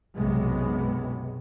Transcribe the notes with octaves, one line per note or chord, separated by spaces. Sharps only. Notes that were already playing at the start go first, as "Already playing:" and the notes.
B1 F#2 C3 G#3 B3